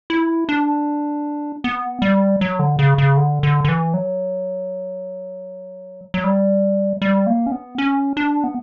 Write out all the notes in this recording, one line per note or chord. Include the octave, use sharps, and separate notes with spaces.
E4
D4
B3
G3
F#3
D3
C#3
C#3
D3
D3
D3
E3
F#3
F#3
G3
G3
A#3
C#4
B3
C#4
D4
B3